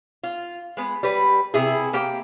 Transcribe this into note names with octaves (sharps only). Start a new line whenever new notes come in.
F4
G#3 B3
G3 B4
C3 E4 G#4
A#3 G4 G5